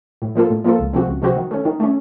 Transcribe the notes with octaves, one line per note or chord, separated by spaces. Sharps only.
A2
F3 A#3 F4 A4
A2
F3 A#3 F4 A4
C#2
C3 F3 C4 F#4
C#2
C3 F3 C4 F#4
D#3
A3 C#4
D#3
A3 C#4